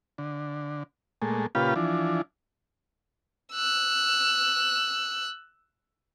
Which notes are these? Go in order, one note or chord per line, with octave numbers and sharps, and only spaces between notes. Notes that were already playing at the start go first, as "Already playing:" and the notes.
D3
A#2 G#3 A3
A#2 C#3 F4 G4 B4 F5
E3 F3 D4
E6 F#6